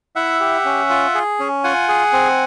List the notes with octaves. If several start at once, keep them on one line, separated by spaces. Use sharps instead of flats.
E4 E5 F#5
G4
C#4
F4
G#4
C#4
F4 F#5 G#5
G#4
C4